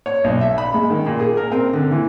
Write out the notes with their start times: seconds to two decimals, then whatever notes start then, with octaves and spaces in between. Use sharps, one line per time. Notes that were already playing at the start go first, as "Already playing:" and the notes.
0.06 C#5
0.24 B1
0.41 E5
0.58 B5
0.74 G#3
0.90 D#3
1.06 A#2
1.20 G#4
1.37 A#4
1.52 C4
1.73 D3
1.91 E3